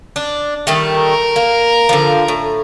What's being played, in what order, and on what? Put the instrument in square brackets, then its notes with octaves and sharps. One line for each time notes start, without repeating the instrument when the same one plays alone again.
[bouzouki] D4
D#3 G3 A3
[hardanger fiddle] A#4
[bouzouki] A#3
D3 F3
A2